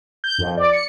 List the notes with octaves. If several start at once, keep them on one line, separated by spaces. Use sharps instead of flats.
G6
F2
D5
C#7